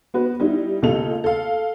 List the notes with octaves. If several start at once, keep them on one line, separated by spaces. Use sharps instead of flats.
B3 F#4 B4
G3 D#4 E4
C#2 C#3 A#3 A4 F7
A4 F5